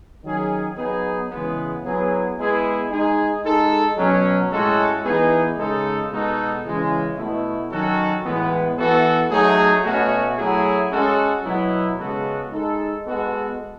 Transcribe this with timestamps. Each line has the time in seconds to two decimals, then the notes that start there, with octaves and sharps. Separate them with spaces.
0.24 D#3 F#3 C#4 G#4
0.76 F#3 B3 D#4 G#4
1.30 C#3 E3 G#3 B3
1.83 F#3 B3 E4 G#4
2.37 G#3 B3 E4 G#4
2.91 G#3 D#4 G#4
3.43 G#3 D#4 A4
3.97 B2 F#3 C#4
4.51 A2 G#3 C#4 F#4 A4
5.04 E3 B3 D#4 G#4
5.58 C#3 G#3 D#4 A4
6.11 B2 G#3 D#4 F#4 A4
6.64 C#3 E3 G#3 C#4
7.17 B2 A3 E4
7.71 D#3 F#3 C#4 F#4 A4
8.24 A2 E3 G#3 B3
8.77 E3 B3 F#4 A4
9.30 F#3 A3 D#4 G#4
9.84 B2 A3 C#4 F#4
10.37 F#3 A3 E4 G#4
10.91 G#3 C#4 F#4 A4
11.45 B2 F#3 B3 E4
11.98 C#3 G#3 B3 F#4 A4
12.52 G#3 D#4 A4
13.05 G#3 B3 F#4 A4